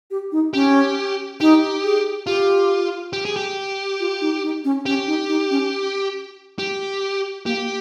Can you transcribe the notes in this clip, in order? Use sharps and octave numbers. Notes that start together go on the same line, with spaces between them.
G4
D#4
C#4 G4
D#4 G4
G#4
F4 G4
G4
G#4
G4
F4
D#4
D#4
C#4
C#4 G4
D#4
D#4
C#4
G4
A#3 G4